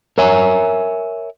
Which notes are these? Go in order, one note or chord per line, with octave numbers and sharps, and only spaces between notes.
A#4 C#5 E5 G#5 A#5